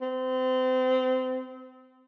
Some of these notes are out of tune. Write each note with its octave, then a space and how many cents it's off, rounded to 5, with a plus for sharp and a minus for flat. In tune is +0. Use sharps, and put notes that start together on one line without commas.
C4 -30